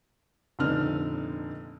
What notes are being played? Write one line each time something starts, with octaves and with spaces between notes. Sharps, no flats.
F1 A#2 D3 C4 D#4 F6